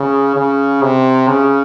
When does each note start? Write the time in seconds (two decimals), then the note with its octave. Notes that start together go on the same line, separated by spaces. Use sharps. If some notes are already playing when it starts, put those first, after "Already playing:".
Already playing: C#3
0.36 C#3
0.82 C3
1.28 C#3